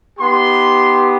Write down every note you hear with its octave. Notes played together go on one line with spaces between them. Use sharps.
B3 D#4 G4 C6